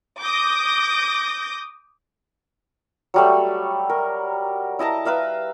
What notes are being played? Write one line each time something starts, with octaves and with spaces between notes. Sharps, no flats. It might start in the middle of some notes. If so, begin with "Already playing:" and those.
D6 D#6 G6 A#6
F#3 G3 A3
A#4
E4 D#5 A5 A#5
B4 E5 F5 A#5